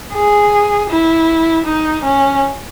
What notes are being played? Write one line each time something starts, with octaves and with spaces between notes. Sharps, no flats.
G#4
E4
D#4
C#4